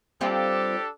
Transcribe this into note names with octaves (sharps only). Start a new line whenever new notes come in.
G3 C4 D4 F4 G4 A4